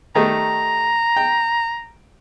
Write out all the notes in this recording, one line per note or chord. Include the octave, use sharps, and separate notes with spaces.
D#3 G3 A3 A#5
G5